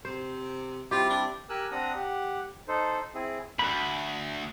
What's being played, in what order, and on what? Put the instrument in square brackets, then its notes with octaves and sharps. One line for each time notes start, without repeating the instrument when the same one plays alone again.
[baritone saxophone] C3 [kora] C5
[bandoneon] G3 C4 E4 [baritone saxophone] F4 [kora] G4
[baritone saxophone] D4
[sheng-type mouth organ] G4 A#4 G#5 E6 F#6
C4 D4 F#5 A#5 D#6
G4 F#5
D#4 A4 C5
C4 E4 G#4
[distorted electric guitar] D2 G2 [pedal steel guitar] B5